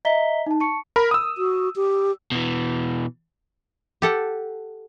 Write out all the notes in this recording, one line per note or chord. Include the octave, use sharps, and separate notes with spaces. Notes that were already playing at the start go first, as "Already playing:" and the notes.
D#5 E5 A#5 B6 G7
D#4 A5
A5 C#6 C#7
A#4 B5
D#6 E6
F#4
G4
B2 E3
G4 A4 F#5